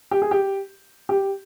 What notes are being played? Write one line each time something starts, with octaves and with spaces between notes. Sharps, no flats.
G4
G#4
G4
G4